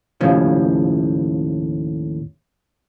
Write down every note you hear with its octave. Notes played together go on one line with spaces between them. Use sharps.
D#2 A2 C#3 F3